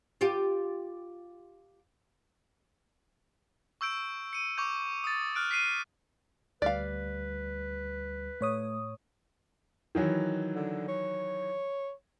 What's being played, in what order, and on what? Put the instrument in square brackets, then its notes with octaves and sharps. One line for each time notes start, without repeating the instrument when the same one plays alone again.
[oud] F4 G4
[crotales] C#6 E6 G6 D7
C#7 D#7
C#6 D6 G6
D#6 A6
F6 F#6 D7
B6 C7 D#7
[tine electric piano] D2 G3 [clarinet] B4 [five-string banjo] D5 F5
[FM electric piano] A2 C#5 D#6 [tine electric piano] A3
[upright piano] D#3 E3 F#3
[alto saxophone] D3
C#5